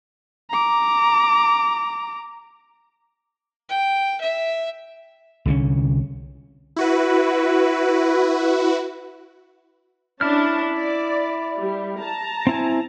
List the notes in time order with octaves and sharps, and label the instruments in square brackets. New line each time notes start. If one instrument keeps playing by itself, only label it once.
[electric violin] A#5 D6
[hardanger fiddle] G5
E5
[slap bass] C2 D3 F#3 C#4
[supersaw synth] E4 F#4 B4
[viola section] C#4 D4 A5 [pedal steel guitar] E4 F6
[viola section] D5
G3
A5 A#5
[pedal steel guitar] C4 E4 G#5